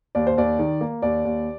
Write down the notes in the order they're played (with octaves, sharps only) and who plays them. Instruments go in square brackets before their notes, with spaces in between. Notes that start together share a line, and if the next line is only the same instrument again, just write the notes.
[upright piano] D#2 D5
C5
D#2 D5
D#3
A#3
D#2 D5
D#2